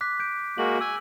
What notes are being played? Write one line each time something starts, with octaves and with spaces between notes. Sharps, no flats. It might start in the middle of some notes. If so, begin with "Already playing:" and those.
D6 F#6 B6
G6 D7
G#3 A#3 F#4 F#7
G#5 E6